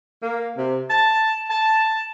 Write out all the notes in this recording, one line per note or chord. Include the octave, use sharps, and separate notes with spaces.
A#3
C3
A5
A5